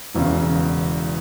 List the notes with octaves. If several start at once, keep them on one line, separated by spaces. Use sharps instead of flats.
E1 E2 C#3